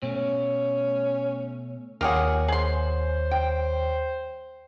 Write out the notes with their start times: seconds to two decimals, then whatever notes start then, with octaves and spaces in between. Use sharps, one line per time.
0.03 B2 A3 C#4
2.01 D#2 F4 G4 G#4 A#4 C#5 F#5
2.48 G#4 C5 C6
3.31 G5